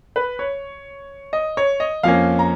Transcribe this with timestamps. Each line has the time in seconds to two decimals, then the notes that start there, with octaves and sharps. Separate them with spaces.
0.16 B4
0.39 C#5
1.33 D#5
1.57 C#5
1.80 D#5
2.03 F2 F3 A#3 C#4 F5
2.39 A#5